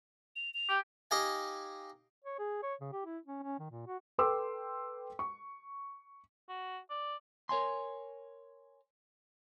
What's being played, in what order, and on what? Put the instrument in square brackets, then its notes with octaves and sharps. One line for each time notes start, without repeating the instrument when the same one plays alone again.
[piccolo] F7
F7
[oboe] G4
[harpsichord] D#4 G4 D#5 F5 G#5
[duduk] C#5
G#4
C#5
C#3
G4
E4
C#4
C#4
D#3
A#2
F#4
[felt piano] A4 B4 G5 C6 D6 E6
C#6
[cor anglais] F#4
D5
[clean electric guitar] A#4 C#5 G#5 C6